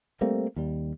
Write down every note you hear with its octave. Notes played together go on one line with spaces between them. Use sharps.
G3 A3 A#3 C4
D#2 G3